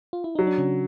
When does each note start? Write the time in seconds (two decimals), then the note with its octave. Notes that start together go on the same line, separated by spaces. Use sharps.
0.13 F4
0.24 E4
0.35 F#3 D#4
0.47 D4
0.58 C#3 C#4